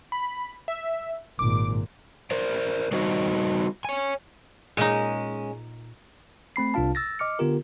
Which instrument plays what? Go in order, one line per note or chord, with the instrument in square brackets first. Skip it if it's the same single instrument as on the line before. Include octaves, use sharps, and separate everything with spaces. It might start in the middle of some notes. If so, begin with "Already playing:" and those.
[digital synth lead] B5
E5
[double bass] G#1 A#2 [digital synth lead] D6
[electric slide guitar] A#4 C5 D5
G3 D#4 F#4 C5 D#5
C#5 G#5
[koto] A#2 D#4 [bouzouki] G#3 C#4
[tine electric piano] A3 C4 B5 C7
C2 C3 D4 F4 F5 A5
E6 A6 A#6
D#5 D6 F6 C#7
D3 B3 F4 G4 A#4